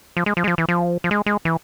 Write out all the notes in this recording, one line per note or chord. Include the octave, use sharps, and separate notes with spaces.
F3
G#3
F3
G#3
F3
E3
F3
F3
G#3
G#3
E3